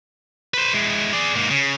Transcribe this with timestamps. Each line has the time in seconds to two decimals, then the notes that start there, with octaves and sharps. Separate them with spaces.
0.54 B4 C5
0.74 G#3 E4
1.13 G#4 D5
1.35 G#2 A#3
1.50 C#3